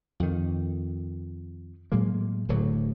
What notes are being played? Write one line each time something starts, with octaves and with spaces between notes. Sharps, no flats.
F2 D#3
A2 F#3 G#3 A#3
D1 D2 A2 F#3